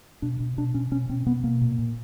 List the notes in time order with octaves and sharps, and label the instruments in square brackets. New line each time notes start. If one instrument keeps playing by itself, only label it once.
[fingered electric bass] B2 D4
B2
B2 D4
B2 C#4
B2 C#4
B2 C4
B2 B3
B2 A#3
A#2
A#2